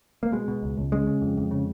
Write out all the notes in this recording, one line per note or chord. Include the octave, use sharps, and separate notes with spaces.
A#3
B2 G#3
B2
C#2
C#2
C#3 G#3
C#3
F2
F2
C#3